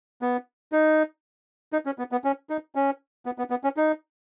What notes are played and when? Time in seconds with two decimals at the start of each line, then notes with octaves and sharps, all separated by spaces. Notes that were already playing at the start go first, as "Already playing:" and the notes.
0.22 B3
0.72 D#4
1.73 D#4
1.86 C#4
1.98 B3
2.12 B3
2.24 C#4
2.50 D#4
2.75 C#4
3.26 B3
3.38 B3
3.50 B3
3.64 C#4
3.77 D#4